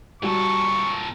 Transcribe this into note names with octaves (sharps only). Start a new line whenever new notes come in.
A#2 G3 F#4 A4 C#6